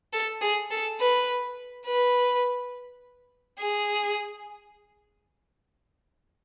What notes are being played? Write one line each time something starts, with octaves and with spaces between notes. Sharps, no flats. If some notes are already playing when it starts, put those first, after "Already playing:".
A4
G#4
A4
B4
B4
G#4